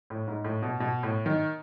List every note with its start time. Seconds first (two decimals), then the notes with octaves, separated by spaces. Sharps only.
0.10 A2
0.27 G#2
0.44 A2
0.63 B2
0.80 B2
1.03 A2
1.26 D#3